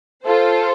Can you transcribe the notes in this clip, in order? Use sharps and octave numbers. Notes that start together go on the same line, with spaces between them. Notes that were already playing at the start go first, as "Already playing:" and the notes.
F4 A4 C5